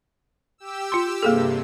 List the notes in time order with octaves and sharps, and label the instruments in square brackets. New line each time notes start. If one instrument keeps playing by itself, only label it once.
[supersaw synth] G4 E6
[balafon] F4 C6
[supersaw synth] G2 C3 [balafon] A#3 G#4 A4